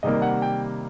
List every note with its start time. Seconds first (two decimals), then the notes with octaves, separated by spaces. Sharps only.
0.03 C3 D#3 G3 A#3 D#5
0.22 F#5
0.42 G5